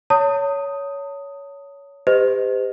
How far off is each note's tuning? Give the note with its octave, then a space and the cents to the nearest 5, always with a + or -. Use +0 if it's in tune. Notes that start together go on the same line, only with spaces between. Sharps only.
C#5 +20 A5 +45 D#6 +5
G4 +30 C5 -45 D#5 +0